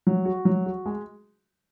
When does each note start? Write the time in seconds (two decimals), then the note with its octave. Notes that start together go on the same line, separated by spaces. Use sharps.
0.07 F#3
0.25 F#4
0.45 F#3
0.66 F#4
0.86 G#3